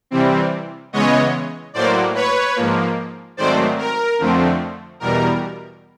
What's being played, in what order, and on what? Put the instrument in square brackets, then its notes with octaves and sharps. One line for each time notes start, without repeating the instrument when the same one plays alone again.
[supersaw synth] C3 E3 G3 C4
C#3 E3 G#3 B3 C#5 D#5
A2 F#3 A#3 C5 D5
B4 C#5
G#2 F3 A#3
G#2 D#3 F#3 A3 C4 C5 D5
A#4
F2 D3 F3 A3 C4
E2 B2 G3 A#4